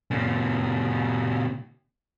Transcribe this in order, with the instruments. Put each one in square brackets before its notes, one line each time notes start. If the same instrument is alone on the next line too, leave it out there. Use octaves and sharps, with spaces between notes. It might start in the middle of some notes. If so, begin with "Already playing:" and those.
[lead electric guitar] A#2 C#3